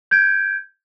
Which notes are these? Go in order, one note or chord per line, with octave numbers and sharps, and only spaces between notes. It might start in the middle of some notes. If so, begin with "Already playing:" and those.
G6 G#6 D7